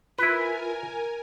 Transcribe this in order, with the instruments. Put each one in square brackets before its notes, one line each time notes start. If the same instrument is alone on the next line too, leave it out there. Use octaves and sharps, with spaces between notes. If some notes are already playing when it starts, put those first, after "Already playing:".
[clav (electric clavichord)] E4 B4 [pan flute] F4 [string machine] A#4 G#5